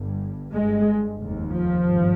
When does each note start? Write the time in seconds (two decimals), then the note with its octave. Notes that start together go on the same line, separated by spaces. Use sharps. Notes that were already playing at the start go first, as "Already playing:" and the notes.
Already playing: G1 G2
0.53 G1 G2 G#3
1.18 F1 D#2
1.51 F3
1.82 G#1 G2